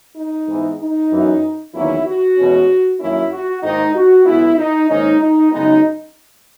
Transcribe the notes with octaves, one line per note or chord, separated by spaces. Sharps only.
D#4
G#2 E3 G#3 B3
D#4
F#2 E3 B3
E2 D#3 F#3 A#3 C#4 E4
F#4
E2 B2 G#3 C#4
F#2 D#3 A#3 C#4 E4
F#4
G#2 D#3 A#3 D#4
F#4
B1 B2 G#3 B3 E4
D#4
G#2 D#3 A#3 C#4 D#4
D#4
F#2 C#3 G#3 B3 D#4